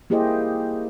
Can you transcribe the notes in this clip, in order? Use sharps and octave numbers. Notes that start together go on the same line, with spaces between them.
A#3 E4 G4 G#4 C5 D#5